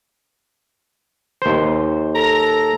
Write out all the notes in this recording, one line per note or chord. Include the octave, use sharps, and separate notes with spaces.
D#2 C5
A4 A#5